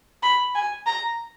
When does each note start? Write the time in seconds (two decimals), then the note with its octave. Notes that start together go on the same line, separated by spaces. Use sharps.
0.23 B5
0.55 G#5
0.86 A#5